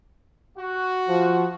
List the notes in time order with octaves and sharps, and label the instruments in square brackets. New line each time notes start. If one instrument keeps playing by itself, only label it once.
[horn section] F#4
[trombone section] F3